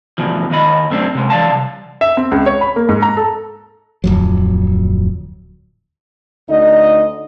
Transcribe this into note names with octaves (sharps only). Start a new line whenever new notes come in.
D2 B2 E3 F3
D#2 D#3 D#5 B5
F#2 A3 C4 D4
C3 G#3
E3 D5 D#5 F5 A5
C2
E5
C4
C#2
C#5
B5
A#3
G#2
A#5
A4
D1 F2 F#3
D2 D3 D#4 D#5